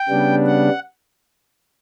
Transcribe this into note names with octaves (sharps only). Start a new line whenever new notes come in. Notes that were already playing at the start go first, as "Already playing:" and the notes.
Already playing: G5
C#3 G3 B3 D4
F#5